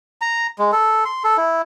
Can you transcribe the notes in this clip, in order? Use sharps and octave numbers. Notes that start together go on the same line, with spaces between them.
A#5
G#3
A4
C6
A4
E4